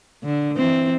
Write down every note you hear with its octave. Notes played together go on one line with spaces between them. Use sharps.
D3
E3 C4